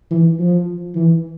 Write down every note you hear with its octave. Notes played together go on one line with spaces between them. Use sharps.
E3
F3
E3